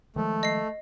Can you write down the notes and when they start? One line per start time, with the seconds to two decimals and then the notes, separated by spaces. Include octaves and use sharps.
0.16 D#3 F3 G#3 A3
0.43 D#5 C7